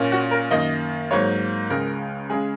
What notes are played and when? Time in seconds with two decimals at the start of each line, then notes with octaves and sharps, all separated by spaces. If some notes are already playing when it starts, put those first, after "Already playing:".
Already playing: A#2 A#3 C#4
0.12 F#4
0.31 A#4
0.51 F#2 D#3 A#3 D#5
1.11 G#2 F#3 A#3 C#5
1.70 C#2 C#3 G#3 A#4
2.30 C#3 G#3 G#4